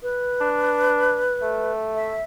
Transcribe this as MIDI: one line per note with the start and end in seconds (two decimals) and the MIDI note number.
0.03 1.72 71
0.41 1.29 62
1.42 2.16 57
1.95 2.23 76